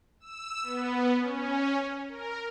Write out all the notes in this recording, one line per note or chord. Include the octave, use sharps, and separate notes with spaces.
E6
B3
C#4
A#4